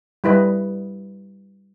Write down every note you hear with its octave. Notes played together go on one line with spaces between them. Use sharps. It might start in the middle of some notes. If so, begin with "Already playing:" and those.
G3 E4 B4 D#5